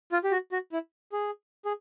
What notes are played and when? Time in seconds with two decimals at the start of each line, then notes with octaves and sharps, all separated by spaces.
0.12 F4
0.24 G4
0.32 F#4
0.52 F#4
0.72 E4
1.12 G#4
1.65 G#4